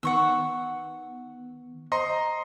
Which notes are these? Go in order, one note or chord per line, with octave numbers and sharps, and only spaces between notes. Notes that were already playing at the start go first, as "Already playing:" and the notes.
D#3 B3 F#5 C#6 E6
C5 D#5 A#5 C6 C#7